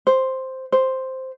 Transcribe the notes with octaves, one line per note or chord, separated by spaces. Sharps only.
C5
C5